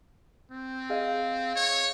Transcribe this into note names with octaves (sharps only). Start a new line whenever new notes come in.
C4
G#4 D#5 F5
C#5